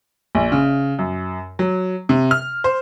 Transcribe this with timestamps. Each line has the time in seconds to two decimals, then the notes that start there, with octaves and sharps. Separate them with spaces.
0.35 A#1
0.52 C#3
0.99 F#2
1.59 F#3
2.09 C3
2.31 F6
2.64 C5